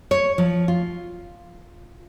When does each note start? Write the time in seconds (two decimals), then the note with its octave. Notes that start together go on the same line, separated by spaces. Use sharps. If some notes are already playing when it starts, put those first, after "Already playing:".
0.11 C#5
0.38 F3
0.68 F4